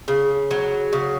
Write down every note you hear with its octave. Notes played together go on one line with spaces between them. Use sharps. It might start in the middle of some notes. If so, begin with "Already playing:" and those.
C#3
F#3
C#3